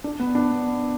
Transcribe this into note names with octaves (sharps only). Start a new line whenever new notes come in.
D4
B3
D4
B3